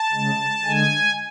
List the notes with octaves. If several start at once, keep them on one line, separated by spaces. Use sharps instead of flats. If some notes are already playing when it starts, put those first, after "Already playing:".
Already playing: A5
C#3 G#3
D3 G#3 G#5